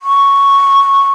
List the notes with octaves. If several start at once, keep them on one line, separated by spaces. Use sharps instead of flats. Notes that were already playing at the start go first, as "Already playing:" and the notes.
C#6